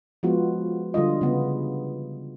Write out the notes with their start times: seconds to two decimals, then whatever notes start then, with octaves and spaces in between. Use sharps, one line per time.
0.23 F3 G#3 B3 F4 F#4
0.94 D3 G3 F4 D#5
1.21 C#3 B3